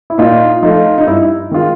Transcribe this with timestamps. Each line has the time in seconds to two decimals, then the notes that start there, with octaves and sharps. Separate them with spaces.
0.10 E4
0.18 A#2 D#4 F4
0.62 F3 A3 D#4 F4
0.98 D#4
1.07 G2 E4
1.51 D#3 G#3 F4